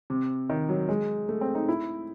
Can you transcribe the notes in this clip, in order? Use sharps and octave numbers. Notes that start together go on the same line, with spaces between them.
C3
D#3
F#3
G#3
A3
C4
D#4
E4